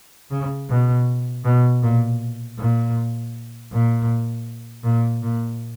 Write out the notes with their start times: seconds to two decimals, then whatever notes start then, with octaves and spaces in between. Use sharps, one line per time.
0.31 C#3
0.69 B2
1.45 B2
1.82 A#2
2.58 A#2
3.72 A#2
4.84 A#2
5.23 A#2